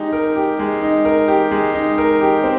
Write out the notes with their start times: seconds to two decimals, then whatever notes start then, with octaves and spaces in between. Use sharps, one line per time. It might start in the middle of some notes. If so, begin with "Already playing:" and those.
Already playing: G#3 D#4 G4
0.13 A#4
0.36 G4
0.59 G#3
0.82 D#4
1.05 A#4
1.28 G4
1.51 G#3
1.74 D#4
1.98 A#4
2.21 G4
2.44 C4